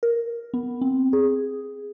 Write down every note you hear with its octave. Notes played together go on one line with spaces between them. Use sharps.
A#4
B3
C4
G#4